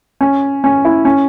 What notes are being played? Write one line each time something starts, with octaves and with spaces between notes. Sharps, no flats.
C#4
C#4
E4
C#4